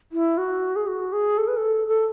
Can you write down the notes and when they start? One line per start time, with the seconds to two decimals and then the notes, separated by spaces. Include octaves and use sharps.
0.12 E4
0.38 F#4
0.76 G#4
0.87 F#4
1.13 G#4
1.38 A4
1.48 B4
1.57 A4
1.88 A4